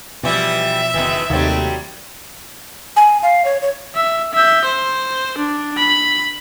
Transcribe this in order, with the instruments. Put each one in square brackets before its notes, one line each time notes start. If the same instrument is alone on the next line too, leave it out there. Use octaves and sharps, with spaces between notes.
[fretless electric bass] B2 F3 [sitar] E3 G3 E4 [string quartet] E5
[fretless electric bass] F#1 [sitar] B2 D#3 E3
[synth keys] D#2 [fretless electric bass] C3 A3 [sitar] F#3 G3 C4
[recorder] G#5
F5
C#5
C#5
[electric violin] E5
E5 G6
C5
D4
B5